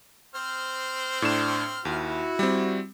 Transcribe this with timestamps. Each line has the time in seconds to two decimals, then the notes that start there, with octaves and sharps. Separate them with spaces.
0.35 C4 C5 F6
1.22 A2 D4 E7
1.85 D#2 E4 F#4
2.39 G3 C4